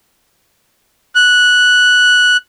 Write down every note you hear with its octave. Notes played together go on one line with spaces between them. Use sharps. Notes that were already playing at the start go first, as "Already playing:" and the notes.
F#6